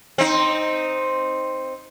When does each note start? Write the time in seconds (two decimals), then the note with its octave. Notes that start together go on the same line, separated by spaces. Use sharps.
0.18 C4 D#4